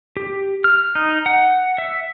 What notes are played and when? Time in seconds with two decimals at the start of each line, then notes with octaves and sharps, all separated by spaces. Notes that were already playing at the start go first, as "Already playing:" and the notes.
0.17 G4
0.64 F6
0.95 D#4
1.26 F#5
1.78 E5